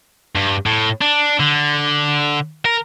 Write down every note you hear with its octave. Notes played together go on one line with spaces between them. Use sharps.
G2
A2
D4
D3
A#4